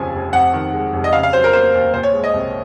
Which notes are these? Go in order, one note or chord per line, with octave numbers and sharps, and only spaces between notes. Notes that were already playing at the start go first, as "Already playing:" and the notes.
Already playing: F1 D#2 C#3 F3 G#5
F1
F2 F#5
D#3
G#3
F1
D#5
C#3 F5
F5
F#3 C5
A#4
A#3 C5
D#2
A#2 C5
C#5
G#3
D#5
C2